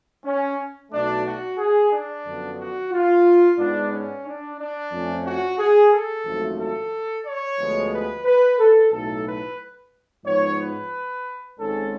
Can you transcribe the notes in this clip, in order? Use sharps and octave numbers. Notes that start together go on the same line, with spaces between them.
C#4
B1 B2 A3 D4
F#4
G#4
D4
F#2 D3 F3 B3
F#4
F4
G#2 G#3 B3 D4
C#4
D4
D4
F2 F3 A3 C#4
F#4
G#4
A4
G#1 F#2 F3 A3
A4
C#5
D2 D3 F3 G#3 B3
B4
B4
A4
B1 A2 F#3 A4
B4
G#2 F3 B3 C#5
B4
G#1 G#2 G#3 C#4 A4